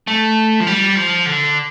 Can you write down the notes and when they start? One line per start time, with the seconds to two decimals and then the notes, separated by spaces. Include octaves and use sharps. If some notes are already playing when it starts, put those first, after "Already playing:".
0.07 A3
0.60 F3
0.67 G3
0.96 F3
1.26 D3